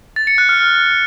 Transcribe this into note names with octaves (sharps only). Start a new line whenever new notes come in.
A6
C#7
F#6
F6